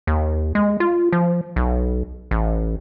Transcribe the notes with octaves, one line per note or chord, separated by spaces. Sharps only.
D#2
G#3
F4
F3
B1
A1